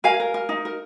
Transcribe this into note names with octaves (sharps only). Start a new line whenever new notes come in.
A#4 F5 G#5
A#4
A#4
D#4
A#4